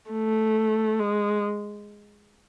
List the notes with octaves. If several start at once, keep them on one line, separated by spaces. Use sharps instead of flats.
A3
G#3